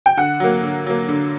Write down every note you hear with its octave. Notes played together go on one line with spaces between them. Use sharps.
G5
D3 F#5
F#3 A#3
D3
F#3 A#3
D3